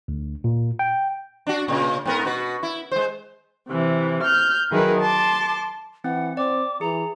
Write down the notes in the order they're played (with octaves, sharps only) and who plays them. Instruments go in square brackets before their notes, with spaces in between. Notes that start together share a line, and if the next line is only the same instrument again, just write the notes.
[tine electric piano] D2
A#2
G5
[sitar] D4 F#4
A#2 C#3
G#2 B3 A#4
B2 F#4 B4
E4
G#3 C5
[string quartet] C3 E3
F6 G6
D#3 F#3 E4 G#4 A#4 B4
A5 C6 D6
[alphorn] E3 [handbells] C4 [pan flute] F#5
[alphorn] C4 [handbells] D5 [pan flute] D6
[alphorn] E3 [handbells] G#4 [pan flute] A#5